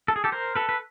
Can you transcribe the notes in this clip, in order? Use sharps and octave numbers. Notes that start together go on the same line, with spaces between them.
A4
G#4
G4 A4
A#4 C5
A4 B4
B4